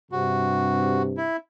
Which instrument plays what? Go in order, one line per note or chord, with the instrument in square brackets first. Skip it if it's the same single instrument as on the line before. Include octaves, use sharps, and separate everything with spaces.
[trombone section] G2 C3 [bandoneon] F#4
[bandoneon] E4